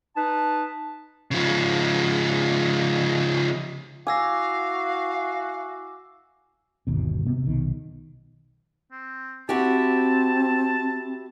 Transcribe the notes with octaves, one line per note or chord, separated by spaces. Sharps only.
D#4 B4 A5
C#3 F3
E4 F#4 F5 G#5 D6 E6 A#6
G1 D#2 B2
C3 B3 C4
B1 D#3
C4
C4 E4 F#4 G4 A5